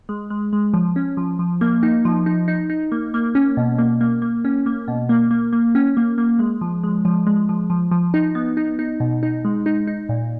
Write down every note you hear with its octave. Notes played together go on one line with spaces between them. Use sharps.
G#3
G#3
G#3
F3
C#4
F3
F3
A#3
D#4
F3
D#4
D#4
D#4
A#3
A#3
C#4
B2
A#3
A#3
A#3
C#4
A#3
B2
A#3
A#3
A#3
C#4
A#3
A#3
G#3
F3
G#3
F3
G#3
F3
F3
F3
D#4
B3
D#4
D#4
B2
D#4
G#3
D#4
D#4
A#2